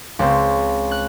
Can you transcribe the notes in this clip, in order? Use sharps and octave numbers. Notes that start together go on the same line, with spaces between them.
C#2 C4
F#6